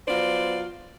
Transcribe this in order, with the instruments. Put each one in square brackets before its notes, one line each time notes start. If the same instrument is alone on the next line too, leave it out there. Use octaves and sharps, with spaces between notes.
[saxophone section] F#3 B3 F4 C5 D5